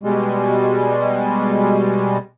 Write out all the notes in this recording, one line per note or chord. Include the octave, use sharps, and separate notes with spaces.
B2 G3 G#3